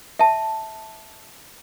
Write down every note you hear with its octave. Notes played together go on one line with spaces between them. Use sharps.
E5 A5